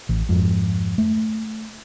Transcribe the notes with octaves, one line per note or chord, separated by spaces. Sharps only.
A1
F2 G#2
A3